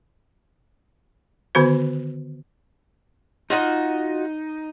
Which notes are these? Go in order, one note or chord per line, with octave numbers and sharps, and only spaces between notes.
D3 D#3 B3 F#4 C5
D#4 F4 F#4 D#5